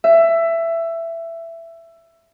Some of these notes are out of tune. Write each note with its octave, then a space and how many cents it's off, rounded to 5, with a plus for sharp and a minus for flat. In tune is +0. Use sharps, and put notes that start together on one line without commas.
E5 +15